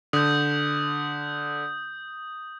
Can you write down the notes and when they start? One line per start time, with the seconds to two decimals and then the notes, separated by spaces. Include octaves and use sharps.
0.13 D3 D#6 G6